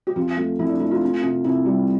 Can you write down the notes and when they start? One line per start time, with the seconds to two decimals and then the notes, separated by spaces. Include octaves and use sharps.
0.07 G4
0.16 F2 F4
0.37 A3
0.59 F2 E4
0.69 D4
0.80 A3 E4
0.91 F4
1.01 C4
1.23 C3
1.44 C3 E4
1.66 G3